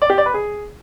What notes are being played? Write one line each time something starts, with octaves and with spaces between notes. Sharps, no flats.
D5
G4
D5
B4
G#4